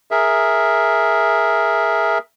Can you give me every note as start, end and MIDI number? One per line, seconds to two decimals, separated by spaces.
0.11 2.18 68
0.11 2.18 70
0.11 2.18 76